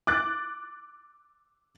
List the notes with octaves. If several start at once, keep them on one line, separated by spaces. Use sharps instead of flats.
D6 F#6 A6